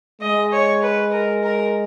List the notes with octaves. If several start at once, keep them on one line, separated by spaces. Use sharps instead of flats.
G#3 D#5
C#5
B4
A#4
A#4